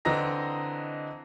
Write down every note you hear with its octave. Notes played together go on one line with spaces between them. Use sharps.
D3 E3 C4 D#5 A#5 A#6